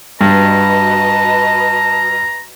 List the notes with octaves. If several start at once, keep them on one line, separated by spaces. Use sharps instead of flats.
G2 F#4 B4 D#5 A5 A#5